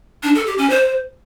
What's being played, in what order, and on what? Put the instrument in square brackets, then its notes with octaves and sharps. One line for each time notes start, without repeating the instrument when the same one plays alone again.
[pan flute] D4
A4
G4
C#4
C5